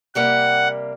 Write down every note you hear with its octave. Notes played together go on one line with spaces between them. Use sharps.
C3 G3 A#3 F#5